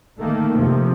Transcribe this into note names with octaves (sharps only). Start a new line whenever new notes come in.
D#3 A3 A#3
F2 C3 F3